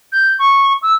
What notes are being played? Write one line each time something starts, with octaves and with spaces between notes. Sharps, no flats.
G6
C#6
E6